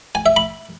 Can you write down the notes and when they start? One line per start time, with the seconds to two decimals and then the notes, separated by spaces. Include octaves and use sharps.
0.15 G#5
0.26 E5
0.36 B5